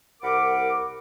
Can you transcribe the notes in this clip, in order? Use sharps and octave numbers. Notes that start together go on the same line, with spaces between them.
C2 A#4 F#5 B5 D6